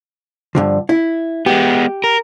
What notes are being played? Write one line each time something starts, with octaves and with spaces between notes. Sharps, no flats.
G2 D3 F3
E4
G#3 B3 G4
A#4